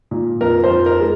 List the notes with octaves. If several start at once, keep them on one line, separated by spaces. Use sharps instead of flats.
A#2
F2 A#4
C5
F2
A#4
G#3